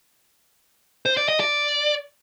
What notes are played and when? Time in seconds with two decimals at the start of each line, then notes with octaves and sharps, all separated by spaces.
1.06 C5
1.17 D5
1.29 D#5
1.40 D5